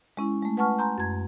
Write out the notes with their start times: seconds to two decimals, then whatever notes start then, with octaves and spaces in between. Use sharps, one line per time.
0.17 G#3 C#4 E4
0.43 G#3 A3
0.57 B4 F#5 G#5 A5 C#6 F6
0.78 G#5 A#5 C6 G6
0.98 F#2 G#6